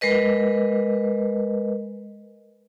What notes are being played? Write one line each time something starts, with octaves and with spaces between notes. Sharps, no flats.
G#3 A#4 B4 D#5